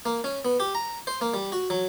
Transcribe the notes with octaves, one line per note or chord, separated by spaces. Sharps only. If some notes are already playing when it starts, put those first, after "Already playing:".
A#3
C#4
B3
G4
A#5
C5
A#3
G3
F#4
F#3